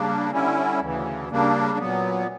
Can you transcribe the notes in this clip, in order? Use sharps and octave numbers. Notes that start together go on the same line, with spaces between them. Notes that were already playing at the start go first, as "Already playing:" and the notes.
Already playing: C#3 G3 A#3 D4
D3 G3 C#4 E4
D2 C#3 E3
C#3 G3 A#3 D4
A#2 F#3 B3